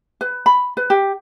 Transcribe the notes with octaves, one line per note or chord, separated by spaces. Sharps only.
B4
B5
B4
G4